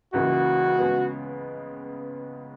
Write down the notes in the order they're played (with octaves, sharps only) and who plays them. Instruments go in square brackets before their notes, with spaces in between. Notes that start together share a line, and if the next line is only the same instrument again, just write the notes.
[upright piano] C#2 C#3 E3 A#3 [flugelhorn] F#4
[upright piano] C#3 G#3 B3